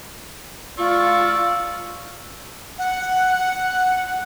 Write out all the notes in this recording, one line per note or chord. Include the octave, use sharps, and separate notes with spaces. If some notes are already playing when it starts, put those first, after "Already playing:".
F4 D5 C#6 E6
F#5